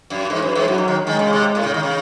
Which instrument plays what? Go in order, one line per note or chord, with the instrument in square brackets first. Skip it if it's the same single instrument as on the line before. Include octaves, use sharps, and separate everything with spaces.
[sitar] F#2
[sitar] G#2 [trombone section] E3
[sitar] F#2
G#2
[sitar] F#2 [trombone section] F#3
[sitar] G#2
D#3
[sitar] D#3 [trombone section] G#3
[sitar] C#3
C3
A2
C#3
D#3
C#3